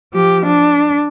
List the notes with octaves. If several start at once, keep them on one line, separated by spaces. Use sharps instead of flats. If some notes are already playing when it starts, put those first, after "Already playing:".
F3 G4
D4